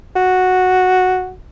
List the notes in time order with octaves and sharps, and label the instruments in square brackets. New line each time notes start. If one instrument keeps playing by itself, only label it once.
[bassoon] F#4